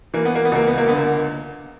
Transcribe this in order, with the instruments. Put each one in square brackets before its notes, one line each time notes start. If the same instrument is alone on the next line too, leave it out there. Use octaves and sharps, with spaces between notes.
[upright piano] E3 A#3
B3
A#3
B3
C#2 A#3
B3
A#3
D3 B3
A#3